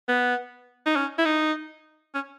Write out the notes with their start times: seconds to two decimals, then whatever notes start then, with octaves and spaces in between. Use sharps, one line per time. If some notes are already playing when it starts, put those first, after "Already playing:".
0.08 B3
0.86 D#4
0.96 C#4
1.18 E4
1.25 D#4
2.15 C#4